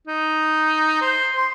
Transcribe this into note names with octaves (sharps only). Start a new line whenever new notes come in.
D#4
C5
C6